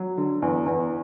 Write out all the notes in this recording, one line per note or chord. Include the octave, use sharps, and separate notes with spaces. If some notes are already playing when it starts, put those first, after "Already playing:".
Already playing: F#3
D3
E2
E2